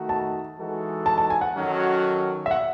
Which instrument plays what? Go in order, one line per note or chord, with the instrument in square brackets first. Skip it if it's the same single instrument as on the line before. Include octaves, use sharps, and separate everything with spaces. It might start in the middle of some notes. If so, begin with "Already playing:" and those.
Already playing: [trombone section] D#3 A3 D#4 F#4
[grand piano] A5
[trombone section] E3 G#3 D#4 F#4 A4
[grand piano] A5
A5
G#5
F#5
[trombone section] D#3 F#3 C#4 F#4 A4
[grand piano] E5
F#5